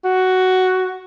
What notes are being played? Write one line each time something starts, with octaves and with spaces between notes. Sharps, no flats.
F#4